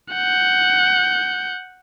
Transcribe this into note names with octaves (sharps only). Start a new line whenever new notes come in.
F#5 G6